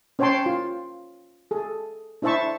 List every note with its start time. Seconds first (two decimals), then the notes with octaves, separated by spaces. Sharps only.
0.19 C#4 C5 C#5 G5 A5 C6
0.46 F4
1.51 G#4 A4
2.22 D4 E4 C5 E5 A5 C#6